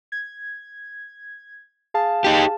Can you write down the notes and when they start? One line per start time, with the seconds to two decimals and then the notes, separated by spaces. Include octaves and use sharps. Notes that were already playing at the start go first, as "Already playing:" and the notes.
0.12 G#6
1.94 G#4 F5 A5
2.24 D#4 G4